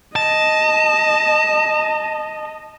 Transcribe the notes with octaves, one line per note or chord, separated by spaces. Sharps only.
D#5 A5